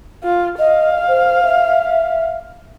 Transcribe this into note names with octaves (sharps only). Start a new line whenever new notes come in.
F4
D#5 F5
C5
E5